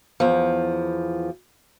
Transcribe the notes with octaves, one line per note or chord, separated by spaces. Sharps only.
E2 F3